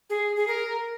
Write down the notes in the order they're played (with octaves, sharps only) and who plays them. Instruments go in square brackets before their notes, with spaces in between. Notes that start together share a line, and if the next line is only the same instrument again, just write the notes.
[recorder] G#4
G#4
A#4